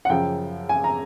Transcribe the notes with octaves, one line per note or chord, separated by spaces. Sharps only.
F#5
F#2 C#3 F3 G5
G#5
A#5